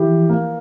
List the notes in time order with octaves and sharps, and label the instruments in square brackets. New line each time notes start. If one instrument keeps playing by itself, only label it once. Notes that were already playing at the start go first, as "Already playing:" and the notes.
Already playing: [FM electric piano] E3 F3 [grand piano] E4 G4
[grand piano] A#3